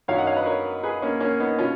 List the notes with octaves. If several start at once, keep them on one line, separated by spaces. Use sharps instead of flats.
F#2 D#3 C#5 F5
D#5 F#5
C#5 F5
B4 D#5
A#4 C#5
G#4 B4
A#3 C#4
A#3 C#4
B3 D#4
B2 C#4 F4